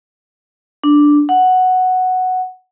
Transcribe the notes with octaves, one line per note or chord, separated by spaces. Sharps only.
D4
F#5